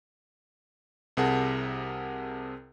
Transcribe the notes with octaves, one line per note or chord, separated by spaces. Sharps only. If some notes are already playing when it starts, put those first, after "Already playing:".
C2 C3 G#4 A#4 F#5 A5